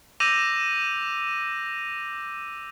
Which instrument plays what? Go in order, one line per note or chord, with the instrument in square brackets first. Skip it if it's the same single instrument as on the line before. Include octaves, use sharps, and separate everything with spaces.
[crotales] D6 E6 G6 A#6 D#7 F7